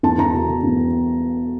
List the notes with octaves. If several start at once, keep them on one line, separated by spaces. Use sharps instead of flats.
E2 A5
E2 A#5
B2
B2
E2